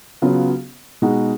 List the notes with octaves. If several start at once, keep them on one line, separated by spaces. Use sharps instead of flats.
C#3 F#3 B3 F4
B2 G#3 D#4 F#4